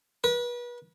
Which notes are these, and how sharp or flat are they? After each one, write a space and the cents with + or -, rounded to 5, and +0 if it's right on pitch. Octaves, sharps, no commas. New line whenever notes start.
B4 -35